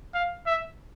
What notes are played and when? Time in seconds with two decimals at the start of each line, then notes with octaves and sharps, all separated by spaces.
0.14 F5
0.46 E5